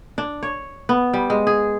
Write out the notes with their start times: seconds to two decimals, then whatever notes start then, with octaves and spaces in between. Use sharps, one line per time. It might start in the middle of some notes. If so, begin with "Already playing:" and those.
0.18 D4
0.43 C#5
0.89 B3
1.13 G3
1.30 G#3
1.47 G#4